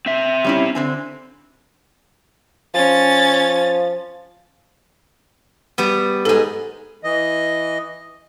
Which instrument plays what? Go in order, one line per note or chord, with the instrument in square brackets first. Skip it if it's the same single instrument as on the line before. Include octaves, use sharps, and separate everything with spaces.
[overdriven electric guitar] C4 E5
[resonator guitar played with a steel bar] G3 C#4 E4
D3 C4 G#5
[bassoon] F3 [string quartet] C#4 A6
[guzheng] G3 B3
[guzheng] G#2 G#3 [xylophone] A4
[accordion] E3 D#5